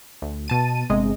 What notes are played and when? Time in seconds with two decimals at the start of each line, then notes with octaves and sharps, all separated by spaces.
0.22 D2
0.48 B2 A5 D#7
0.90 G1 C3 G#3 D#5